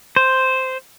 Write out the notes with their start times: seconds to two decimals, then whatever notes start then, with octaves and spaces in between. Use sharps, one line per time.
0.16 C5